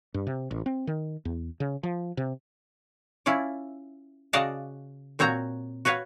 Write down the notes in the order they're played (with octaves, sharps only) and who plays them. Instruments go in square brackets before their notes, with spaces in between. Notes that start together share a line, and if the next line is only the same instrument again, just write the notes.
[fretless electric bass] G2
C3
A1
C4
D#3
E2
C#3
F3
C3
[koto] C#4 E4 F4 D5
C#3 F#4 D5 D#5 F5 A5
A#2 C4 F#4 C#5 A#5
F#4 B4 C#5 F5